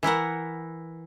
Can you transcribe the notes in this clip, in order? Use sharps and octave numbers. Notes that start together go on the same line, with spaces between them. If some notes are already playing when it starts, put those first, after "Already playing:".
E3 E4 A#4 F#5